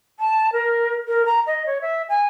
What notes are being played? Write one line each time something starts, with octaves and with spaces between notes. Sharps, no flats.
A5
A#4
A#4
A#5
D#5
C#5
E5
G#5